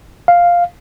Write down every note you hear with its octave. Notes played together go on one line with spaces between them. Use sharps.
F5